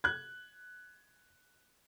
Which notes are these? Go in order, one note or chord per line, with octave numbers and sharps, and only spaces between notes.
F#6 G#6